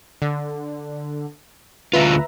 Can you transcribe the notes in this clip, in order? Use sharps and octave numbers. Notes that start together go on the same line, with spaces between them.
D3
D2 F4 B4 E5 A#5